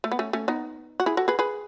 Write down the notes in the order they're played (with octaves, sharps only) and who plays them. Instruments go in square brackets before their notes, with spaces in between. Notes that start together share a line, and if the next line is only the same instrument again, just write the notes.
[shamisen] A3
B3
A3 C#4
A3 C#4
B3 D#4
F#4
E4 G#4
F#4 A4
G#4 B4
G#4 B4